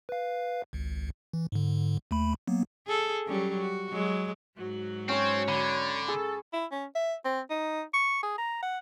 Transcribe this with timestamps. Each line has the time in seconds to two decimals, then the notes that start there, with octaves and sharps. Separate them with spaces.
0.09 B4 F5
0.73 G#1 C#2
1.33 E3
1.52 G#2 D3
2.11 D#2 A3 B5
2.47 F#3 A#3 B3
2.87 G#4 A4
3.26 F#3 G3 C#4
3.60 F#4
3.93 F#3 G#3
4.56 G#2 F#3 F#4
5.09 C4 C#4 C#5 C6
5.48 D3 B5
6.08 G#4 A4
6.53 E4
6.71 C#4
6.95 E5
7.25 C4
7.50 D#4
7.94 C#6
8.23 G#4
8.38 A#5
8.63 F#5